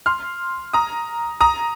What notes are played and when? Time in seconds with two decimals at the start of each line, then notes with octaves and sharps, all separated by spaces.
0.06 C6 F6
0.73 A#5 D#6
1.41 A#5 D#6